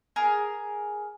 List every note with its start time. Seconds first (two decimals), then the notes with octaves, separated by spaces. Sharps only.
0.16 G#4 A#4